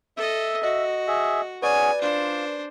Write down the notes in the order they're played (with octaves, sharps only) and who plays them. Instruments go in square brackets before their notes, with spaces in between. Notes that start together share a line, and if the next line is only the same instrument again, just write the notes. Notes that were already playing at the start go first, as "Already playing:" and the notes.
[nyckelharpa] A4 D#5 [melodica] E5
[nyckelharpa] F#4 [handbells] D#5
[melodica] G#4 E5
[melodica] C#4 F#4 G#4 [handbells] B4 D5 [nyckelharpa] G#5
[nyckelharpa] D4 C5 [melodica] F4